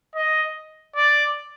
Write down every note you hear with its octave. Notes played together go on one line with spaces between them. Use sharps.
D#5
D5